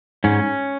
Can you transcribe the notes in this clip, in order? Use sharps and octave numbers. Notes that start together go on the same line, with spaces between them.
G#2 C#4